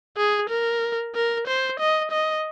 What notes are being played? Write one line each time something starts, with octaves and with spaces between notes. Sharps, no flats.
G#4
A#4
A#4
C5
D#5
D#5